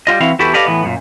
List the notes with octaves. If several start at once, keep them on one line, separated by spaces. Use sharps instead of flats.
G3 F4 D#5
E3 C4 E4 F#4 F5
E2 E4 F#4 G4 A4 B4
G4 A4 B4 D5 D#5 F5
A2 E3 B3
F#2 A#2